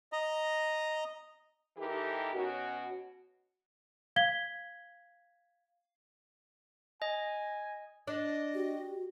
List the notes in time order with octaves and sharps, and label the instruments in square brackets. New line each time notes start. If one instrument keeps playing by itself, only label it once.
[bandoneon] D#5 A#5
[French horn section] E3 D#4 G4 A4 A#4
B2 C#4 F#4
[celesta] F5 G#6 B6 G7
[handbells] D#5 [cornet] G#5
[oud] D4 D5 [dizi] D#5
[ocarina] F#4 [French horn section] G4